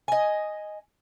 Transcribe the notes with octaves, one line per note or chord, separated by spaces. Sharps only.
D#5 G#5